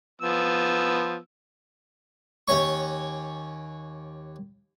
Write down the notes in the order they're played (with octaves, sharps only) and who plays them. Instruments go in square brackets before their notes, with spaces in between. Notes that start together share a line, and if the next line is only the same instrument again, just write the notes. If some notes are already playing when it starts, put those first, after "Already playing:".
[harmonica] F3 B3 E6
[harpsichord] D#2 C#4 C#5 C#6